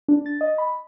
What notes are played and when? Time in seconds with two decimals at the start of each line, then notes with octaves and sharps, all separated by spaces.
0.08 D4
0.26 A6
0.41 D#5
0.58 B5